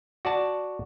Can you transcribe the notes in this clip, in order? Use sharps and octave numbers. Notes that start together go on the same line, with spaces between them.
F#4 D5 A5